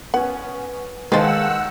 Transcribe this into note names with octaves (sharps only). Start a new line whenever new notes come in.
B3 C#4 F#5
D#3 G#3 B4 C5 F5 F#5 A5 E6